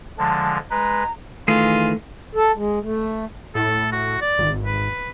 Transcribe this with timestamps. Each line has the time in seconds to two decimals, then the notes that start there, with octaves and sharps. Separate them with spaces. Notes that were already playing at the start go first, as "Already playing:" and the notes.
0.18 D3 F3 G#3 A5
0.71 G#3 B4 A#5
1.48 D#3 E3 A3 F4 G#4
2.35 A4
2.55 G#3
2.82 A3
3.55 A2 A4
3.92 F#4
4.21 D5
4.39 G#1
4.64 B4